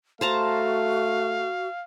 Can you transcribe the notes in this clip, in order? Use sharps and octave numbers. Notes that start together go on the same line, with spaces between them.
A3 F#4 C5 F5 A5 A#5